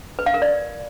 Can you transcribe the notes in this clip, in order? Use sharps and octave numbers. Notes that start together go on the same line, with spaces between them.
B4
F5
A#4
D5